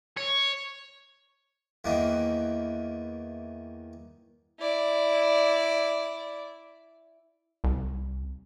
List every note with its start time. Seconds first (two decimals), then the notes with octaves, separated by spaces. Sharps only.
0.17 C#5
1.84 E2 D#3 E3 A#3
4.60 E4 D5
7.64 C2